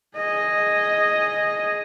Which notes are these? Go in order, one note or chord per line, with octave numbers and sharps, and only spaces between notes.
G#4 D#5